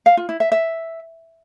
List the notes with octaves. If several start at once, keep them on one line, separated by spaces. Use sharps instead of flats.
F5
F4
E4
E5
E5